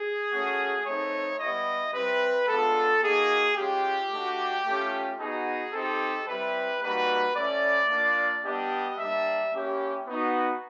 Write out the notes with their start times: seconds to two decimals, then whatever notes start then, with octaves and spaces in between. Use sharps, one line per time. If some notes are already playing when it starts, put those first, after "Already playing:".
Already playing: G#4
0.32 A3 C#4 F#4
0.85 A3 C4 D#4 C#5
1.40 G3 B3 E4 D#5
1.94 G3 C4 E4 B4
2.48 G#3 B3 D4 F4 A4
3.02 A#3 D#4 F#4 G#4
3.57 G#3 C#4 F4 G4
4.11 A3 D4 F#4
4.65 A3 C#4 F4
5.20 B3 D#4 F#4 G#4
5.74 C4 D#4 G4 A4
6.28 G3 C4 E4 G4 B4
6.82 G3 A#3 D#4 F#4 B4
7.36 A3 C#4 E4 D5
7.90 A#3 D4 F4
8.44 G3 B3 D4 G4 D#5
8.99 G3 A#3 D4 E5
9.53 A#3 C#4 E4 G4
10.07 B3 D#4 F#4